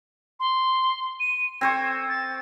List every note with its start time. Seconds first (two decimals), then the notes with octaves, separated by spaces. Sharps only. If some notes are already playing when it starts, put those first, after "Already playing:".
0.40 C6
1.20 D#7
1.61 C4 C5 C#6 G#6
2.09 A6